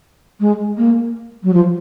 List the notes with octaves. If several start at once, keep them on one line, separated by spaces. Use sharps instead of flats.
G#3
A#3
F#3
F3